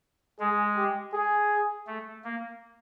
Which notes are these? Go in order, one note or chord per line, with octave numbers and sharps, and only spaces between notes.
G#3 G#4
G4
G#4
A3
A#3